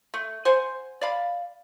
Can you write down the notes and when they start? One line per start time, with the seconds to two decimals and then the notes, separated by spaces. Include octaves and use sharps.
0.14 A3
0.45 C5 F#5 G#5
1.01 D5 F5 B5